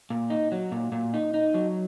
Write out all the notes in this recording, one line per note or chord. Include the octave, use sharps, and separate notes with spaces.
A#2
D#4
F#3
A#2
A#2
D#4
D#4
F#3